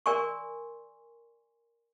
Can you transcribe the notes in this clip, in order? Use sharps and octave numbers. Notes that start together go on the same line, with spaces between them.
A#4 D5 G#5 C6 C#6